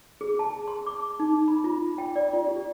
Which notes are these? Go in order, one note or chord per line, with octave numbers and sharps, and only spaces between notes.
G#4
A5
C6
D6
D#4
B5
F4
G5
D5
F4
G4